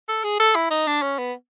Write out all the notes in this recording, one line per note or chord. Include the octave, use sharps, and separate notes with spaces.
A4
G#4
A4
E4
D#4
D4
C#4
B3